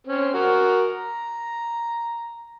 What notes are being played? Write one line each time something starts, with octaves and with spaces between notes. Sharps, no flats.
C4 C#4
F#4 A#4
A#5